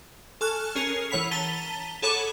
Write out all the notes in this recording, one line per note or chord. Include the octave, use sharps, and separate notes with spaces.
A4 G#5 C#6 F6 F#6
C#4 G#4 A#4 C7
E3 C#5 F#5 B5 B6 F7
A5 A#5 A6 B6 D#7 G7
G#4 A4 C#5 F#5 B5 D6